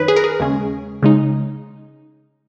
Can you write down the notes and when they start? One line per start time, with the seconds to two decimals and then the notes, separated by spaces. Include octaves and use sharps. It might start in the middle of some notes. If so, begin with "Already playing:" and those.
Already playing: F#2 D#3 D#4 B4 C#5
0.08 G#4
0.16 A#4
0.24 G#4
0.40 D#2 C#3 G#3 C#4
1.03 C#3 G#3 D#4